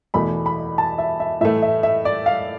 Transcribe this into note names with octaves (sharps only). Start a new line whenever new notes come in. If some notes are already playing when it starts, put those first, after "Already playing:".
E2 B2 A3 B5
B5
A5
E5
E5
A2 E3 A3 E5
E5
E5
D5
F5